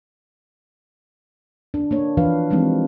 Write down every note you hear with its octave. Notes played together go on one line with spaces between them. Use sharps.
D4
A#3 D4 C#5
E3 F3 D4 B4 F5
E3 F3 G3 G#3 C4 D#4